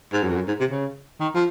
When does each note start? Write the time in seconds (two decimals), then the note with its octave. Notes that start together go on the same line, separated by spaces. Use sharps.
0.12 G#2
0.23 F#2
0.29 F2
0.35 F#2
0.48 G#2
0.60 C3
0.71 C#3
1.20 D#3
1.35 F3